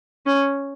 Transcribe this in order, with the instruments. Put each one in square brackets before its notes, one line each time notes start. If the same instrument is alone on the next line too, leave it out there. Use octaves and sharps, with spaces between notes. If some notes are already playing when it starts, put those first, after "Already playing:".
[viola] C#4